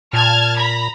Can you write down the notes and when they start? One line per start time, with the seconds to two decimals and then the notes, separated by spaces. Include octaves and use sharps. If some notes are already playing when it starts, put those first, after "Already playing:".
0.13 A#2 A5 F6 G#6
0.58 A#5 B5